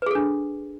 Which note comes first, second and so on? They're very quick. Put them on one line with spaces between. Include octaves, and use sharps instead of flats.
B4 G#4 A4 D4